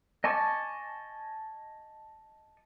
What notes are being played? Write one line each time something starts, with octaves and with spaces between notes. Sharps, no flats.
D#5 G#5 A5 C#6 D6